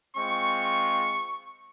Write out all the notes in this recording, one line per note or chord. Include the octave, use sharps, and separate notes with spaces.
G#3 C4 F4 C#6